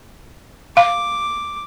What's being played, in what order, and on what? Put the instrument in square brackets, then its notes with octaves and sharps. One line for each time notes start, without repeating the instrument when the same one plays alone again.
[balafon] F5 [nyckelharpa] D6